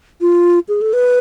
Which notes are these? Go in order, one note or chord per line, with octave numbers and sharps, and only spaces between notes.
F4
G#4
A4
B4